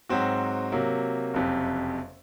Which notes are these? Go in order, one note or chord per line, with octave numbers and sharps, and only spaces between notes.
G#2 F#3 C4 F#4
C3 F#3 A#3
F#1 F2 C3